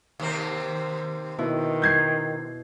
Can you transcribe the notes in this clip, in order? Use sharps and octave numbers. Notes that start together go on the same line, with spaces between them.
D#2 C3 C4 A#4 F6
B2 D#3 E4
G6 G#6 C7